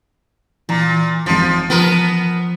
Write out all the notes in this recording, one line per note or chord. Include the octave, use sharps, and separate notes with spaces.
A#2 E3 A#5
G#1 F3 C6
F3 B3 A#4